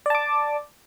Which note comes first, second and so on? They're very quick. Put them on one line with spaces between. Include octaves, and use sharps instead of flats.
D5 A5 D6